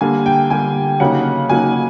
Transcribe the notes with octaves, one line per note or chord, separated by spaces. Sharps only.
D3 G3 A#3 G#5
G5
D3 G3 A#3 G#5
C#3 F#3 A#3 D#4 F#5
C#3 F#3 A#3 D#4 G#5